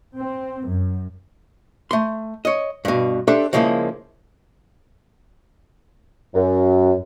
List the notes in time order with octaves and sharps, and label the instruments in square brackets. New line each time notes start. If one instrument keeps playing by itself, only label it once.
[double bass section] C4
F#2
[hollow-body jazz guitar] A3 C6
C#5 D#5
G2 B2
D4 G4 A4 C5 E5
C#3 F3 G#3 A#3 E4
[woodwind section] F#2